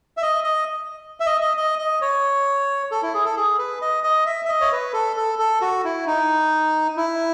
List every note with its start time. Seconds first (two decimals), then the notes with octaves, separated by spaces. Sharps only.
0.17 E5
0.22 D#5
0.44 D#5
1.20 E5
1.26 D#5
1.41 D#5
1.57 D#5
1.79 D#5
2.01 C#5
2.91 A4
3.03 E4
3.14 G#4
3.25 A4
3.36 G#4
3.58 B4
3.82 D#5
4.04 D#5
4.26 E5
4.45 E5
4.49 D#5
4.61 C#5
4.72 B4
4.93 A4
5.16 A4
5.39 A4
5.61 F#4
5.85 E4
6.07 D#4
6.97 E4